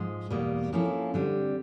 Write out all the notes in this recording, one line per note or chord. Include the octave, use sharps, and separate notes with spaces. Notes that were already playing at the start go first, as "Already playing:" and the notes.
Already playing: G#2 F3 G#3
E2 B2 G3 A#3
F3 A#3 C#4 E4 A4
D3 G3 C4